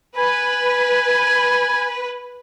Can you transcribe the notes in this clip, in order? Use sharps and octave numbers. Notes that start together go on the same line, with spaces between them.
B4 G#5